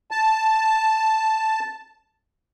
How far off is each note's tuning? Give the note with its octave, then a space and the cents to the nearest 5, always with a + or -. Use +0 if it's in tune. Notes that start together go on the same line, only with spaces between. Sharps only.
A5 +0